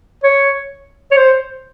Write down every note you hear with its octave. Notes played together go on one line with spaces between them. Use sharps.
C#5
C#5
C5